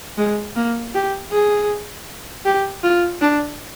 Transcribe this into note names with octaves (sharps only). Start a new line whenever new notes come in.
G#3
A#3
G4
G#4
G4
F4
D4